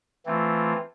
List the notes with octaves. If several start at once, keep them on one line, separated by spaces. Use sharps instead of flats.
E3 A3 C4 F4